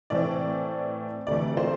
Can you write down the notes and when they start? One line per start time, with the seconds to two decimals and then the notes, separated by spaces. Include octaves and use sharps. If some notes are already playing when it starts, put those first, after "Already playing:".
0.10 A2 E3 A3 C4 D5
1.27 D2 C3 E3 A3 D5
1.57 C5